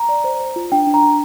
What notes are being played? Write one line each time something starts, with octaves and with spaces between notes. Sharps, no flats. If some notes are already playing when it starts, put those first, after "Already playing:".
Already playing: A#5
D5
C5
C5
F4
D4 G5
D4
A#5
D4